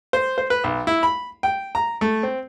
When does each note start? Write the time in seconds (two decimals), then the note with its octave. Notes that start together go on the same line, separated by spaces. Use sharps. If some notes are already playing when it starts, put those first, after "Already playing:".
0.13 C5
0.38 C5
0.50 B4
0.64 B1
0.87 E4
1.03 B5
1.43 G5
1.75 A#5
2.01 A3
2.23 C4